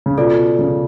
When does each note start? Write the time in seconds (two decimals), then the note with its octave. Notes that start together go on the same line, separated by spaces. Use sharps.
0.06 C#3
0.18 B2 F4 A4 D5
0.59 C#3